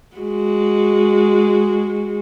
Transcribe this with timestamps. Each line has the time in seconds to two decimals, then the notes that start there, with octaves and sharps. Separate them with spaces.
0.17 G#3 F#4